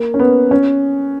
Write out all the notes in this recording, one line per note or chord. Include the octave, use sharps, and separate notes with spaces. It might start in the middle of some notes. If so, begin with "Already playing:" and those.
Already playing: A#3
C#4
B3
C#4